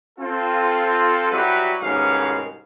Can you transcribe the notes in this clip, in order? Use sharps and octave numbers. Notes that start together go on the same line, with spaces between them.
C4 F4 A4
F#3 G3 E4 F#4 G4 B4
C2 G#2 B2 D#3 C#4 F5